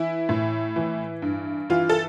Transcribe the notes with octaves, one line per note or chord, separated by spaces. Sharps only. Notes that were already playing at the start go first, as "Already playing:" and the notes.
Already playing: E3 E4
A2
E3
G2
E3 F4
A4